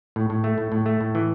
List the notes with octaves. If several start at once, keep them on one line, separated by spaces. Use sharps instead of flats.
A2
A2
A3
A2
A2
A3
A2
E3